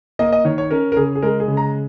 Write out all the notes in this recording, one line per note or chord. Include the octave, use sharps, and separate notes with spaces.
A#3 D#5
D#5
D#3 C#5
C#5
C#4 A#4
A#4
C#3 G#4
G#4
G#3 A#4
G#4
C#3
A#5